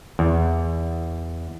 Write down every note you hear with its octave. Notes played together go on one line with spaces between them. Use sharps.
E2